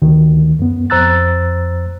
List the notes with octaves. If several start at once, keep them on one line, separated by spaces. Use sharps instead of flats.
D2 D#3
F#2 B3
F2 C5 A#5 E6 F#6 A6